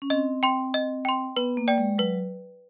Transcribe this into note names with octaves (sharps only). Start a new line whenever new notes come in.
C#4
C4 D#5
G5 C6
D#5
G5 C6
B3 B4
A#3
D5 G5
G#3
F#3 B4